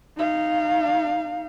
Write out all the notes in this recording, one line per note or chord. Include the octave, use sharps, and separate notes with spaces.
D#4 F5